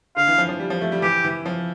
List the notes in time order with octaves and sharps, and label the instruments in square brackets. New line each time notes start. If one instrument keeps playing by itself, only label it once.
[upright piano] D3 [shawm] F5
[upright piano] E3
F3
F3
G3
F3
A3
G3
[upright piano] E3 [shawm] G4
[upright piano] E3
F3